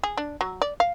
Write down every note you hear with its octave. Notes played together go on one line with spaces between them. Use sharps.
G#4
D4
F#3
D5
F5